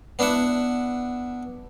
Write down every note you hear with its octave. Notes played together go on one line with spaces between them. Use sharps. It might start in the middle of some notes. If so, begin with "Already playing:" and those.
B3 D4 E4 E5 F#5